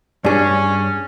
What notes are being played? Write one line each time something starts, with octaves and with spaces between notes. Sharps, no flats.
G2 C#4 D4 G#4